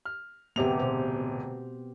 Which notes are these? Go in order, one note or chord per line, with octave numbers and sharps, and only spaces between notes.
F6
D1 C3 B3 C4 G4 F7
B2 C5